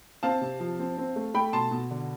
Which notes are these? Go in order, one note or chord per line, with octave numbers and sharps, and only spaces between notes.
C4 F5 A5
C3
F3
C4
C4
A3
A3 G5 B5
B2 A5 C6
B2
D3